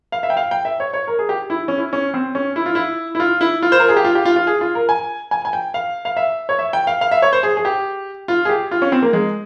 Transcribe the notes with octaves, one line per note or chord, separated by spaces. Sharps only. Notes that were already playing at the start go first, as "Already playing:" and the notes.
F5
E5
G5
F5
G5
E5
C#5
C#5
A#4
G#4
G4
E4
C#4
E4
C#4
C4
C#4
E4
F4
E4
E4
F4
E4
F4
C5
A#4
G#4
G4
F4
G4
F4
F4
G#4
F4
A#4
G#5
G#5
G#5
G5
F5
F5
E5
C#5
E5
G5
F5
F5
E5
C#5
C5
G#4
G#4
G4
F4
G#4
G4
F4
C#4
C4
A#3
G#3